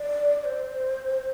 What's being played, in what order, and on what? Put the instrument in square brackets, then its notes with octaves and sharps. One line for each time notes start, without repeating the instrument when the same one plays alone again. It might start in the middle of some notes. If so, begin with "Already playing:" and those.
Already playing: [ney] D5
C5